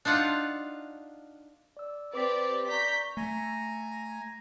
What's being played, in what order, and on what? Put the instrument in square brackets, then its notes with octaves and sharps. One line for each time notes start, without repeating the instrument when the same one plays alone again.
[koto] D4 D#4 F4 F5 F#5
[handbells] D5 E6
[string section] C4 G4 D5 [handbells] B4 D6 B6
[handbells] D5 C#6 [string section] A#5 G6 B6
[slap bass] A3 [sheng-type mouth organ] G#5 A#5